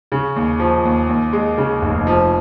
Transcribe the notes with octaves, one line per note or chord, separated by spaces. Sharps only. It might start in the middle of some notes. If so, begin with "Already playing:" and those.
C#3
D#2
F3
D#2
D#2
G#3
C#3
F1
F3